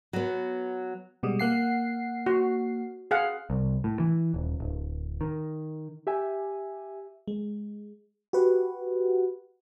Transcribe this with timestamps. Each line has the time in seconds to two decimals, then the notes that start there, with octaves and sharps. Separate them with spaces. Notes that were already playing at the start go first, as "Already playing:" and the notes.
0.13 F#3 B3
1.23 B2 G3 G#3
1.39 A#3 F#5 C7
2.26 F#4
3.11 G#4 F5 F#5
3.50 C2
3.84 A2
4.00 E3
4.34 D#1
4.60 D1
5.21 D#3
6.07 G4 E5 G#5
7.28 G#3
8.33 F#4 G4 B4 F#5